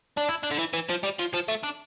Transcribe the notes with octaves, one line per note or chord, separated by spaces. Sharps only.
D4
E4
D4
D3
E3
E3
F3
G3
F3
F3
A3
D4